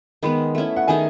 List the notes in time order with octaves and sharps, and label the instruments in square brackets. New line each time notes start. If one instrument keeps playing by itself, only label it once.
[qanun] D#3 G#3 B3 [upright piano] B5
[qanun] A3 C#4 E4
[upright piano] F#5
[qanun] D#3 A3 D#4 G#4 [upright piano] G#5